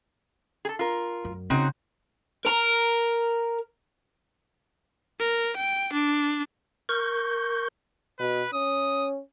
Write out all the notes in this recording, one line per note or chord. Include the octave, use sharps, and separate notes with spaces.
G#4 A4
F4 A#4
F#2
C#3 C4 D#4 F#4
A#4 A#5
A#4
G5
D4
A#4 C#6 G6
B2 B4
C#4 D#6